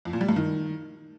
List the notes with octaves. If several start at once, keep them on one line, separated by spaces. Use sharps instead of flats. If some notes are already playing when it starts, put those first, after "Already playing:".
F2
A#2
G3
G2
D#3